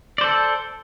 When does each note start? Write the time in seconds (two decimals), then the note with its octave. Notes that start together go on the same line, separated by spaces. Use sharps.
0.18 D5
0.21 C5
0.24 A4